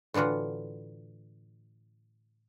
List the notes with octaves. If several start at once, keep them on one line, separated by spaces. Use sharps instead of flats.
A2 D3 E3 F4 F#4